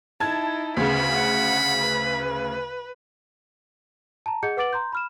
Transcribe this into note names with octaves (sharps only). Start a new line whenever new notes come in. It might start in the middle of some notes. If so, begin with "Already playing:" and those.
D#4 E4 A5 G#6
D2 C#3 B3 B5
F#5
B4
A5 A#5
G#4 D#5 F#5 G6 C#7
B4 F#5 D6 A6 D7 F#7
A#5 C6 G6
B5 F6 E7